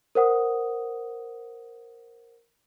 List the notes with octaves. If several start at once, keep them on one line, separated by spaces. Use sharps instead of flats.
A#4 C5 F#5 D#6